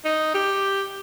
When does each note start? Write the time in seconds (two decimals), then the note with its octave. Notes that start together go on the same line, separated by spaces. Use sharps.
0.05 D#4
0.34 G4